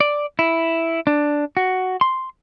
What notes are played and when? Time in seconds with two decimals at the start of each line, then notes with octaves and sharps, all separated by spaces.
0.01 D5
0.39 E4
1.07 D4
1.57 F#4
2.01 C6